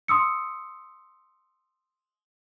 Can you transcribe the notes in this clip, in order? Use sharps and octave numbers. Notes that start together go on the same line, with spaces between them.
C6 D#6 E6 C#7